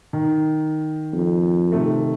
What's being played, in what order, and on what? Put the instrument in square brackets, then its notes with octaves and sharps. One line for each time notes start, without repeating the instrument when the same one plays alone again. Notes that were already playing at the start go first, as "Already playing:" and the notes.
[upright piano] D#3
[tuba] F2
[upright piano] C3 D#3 A3